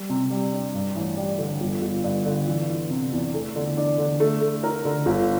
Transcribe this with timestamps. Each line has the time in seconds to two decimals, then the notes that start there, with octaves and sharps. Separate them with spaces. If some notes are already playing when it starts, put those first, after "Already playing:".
Already playing: G3
0.10 C3
0.30 G3
0.53 D4
0.74 G2
0.96 A1
1.17 G3
1.38 D3
1.61 G1
1.82 G1
2.04 G2
2.26 D3
2.47 E3
2.69 E3
2.90 C3
3.12 E2
3.34 A3
3.56 D3
3.77 D4
3.98 D3
4.20 A3
4.41 A3
4.64 A#4
4.85 D3
5.06 G1